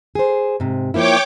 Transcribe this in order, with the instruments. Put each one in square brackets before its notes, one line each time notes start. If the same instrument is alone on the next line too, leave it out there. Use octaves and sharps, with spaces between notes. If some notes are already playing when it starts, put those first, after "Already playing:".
[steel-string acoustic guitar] G#4 C5
G#2 C3
[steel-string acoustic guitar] F3 A#3 E4 [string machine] C#5 G5 D6